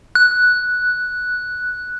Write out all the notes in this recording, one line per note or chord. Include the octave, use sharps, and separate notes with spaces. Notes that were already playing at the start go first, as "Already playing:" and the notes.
F#6